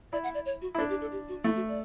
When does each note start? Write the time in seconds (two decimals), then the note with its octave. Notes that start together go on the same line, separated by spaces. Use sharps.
0.12 E4 D5
0.23 F#5
0.34 D5
0.45 C#5
0.61 F#4
0.75 E4
0.78 D4 A4
0.89 G4
1.01 A4
1.12 G4
1.28 F#4
1.44 A3 E4
1.56 F#4
1.68 D5